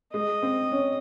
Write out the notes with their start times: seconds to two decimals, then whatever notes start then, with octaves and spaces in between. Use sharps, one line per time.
0.13 G#3 D#5
0.43 C4
0.72 C#4